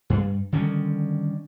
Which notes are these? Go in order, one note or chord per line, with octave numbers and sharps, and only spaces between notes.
G2
D3 D#3 G3 C#4